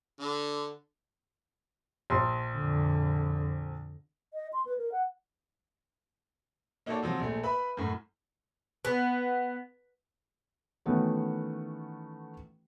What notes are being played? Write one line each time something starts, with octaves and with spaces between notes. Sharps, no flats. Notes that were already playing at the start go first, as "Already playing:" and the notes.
D3
A#1 C6
F2 D3
D#5
C6
B4
A#4
F#5
A#3 D#4 F#4 A4 C#5 D5
C3 F3 F#3
A#1 A3
B4 E5 B5
F#2 A2
B3
D#3 E3 A3 B3 C#4 F#4